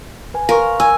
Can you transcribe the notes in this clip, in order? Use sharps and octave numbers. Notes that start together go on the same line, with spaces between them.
B4 G#5
A#4 F5 C6 C#6
G#5 E6